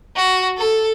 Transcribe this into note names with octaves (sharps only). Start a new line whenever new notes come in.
F#4
A4